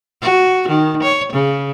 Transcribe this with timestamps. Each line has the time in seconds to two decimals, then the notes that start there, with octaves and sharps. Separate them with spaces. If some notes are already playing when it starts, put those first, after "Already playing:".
0.22 F#4
0.68 D#3
1.03 C#5
1.32 C#3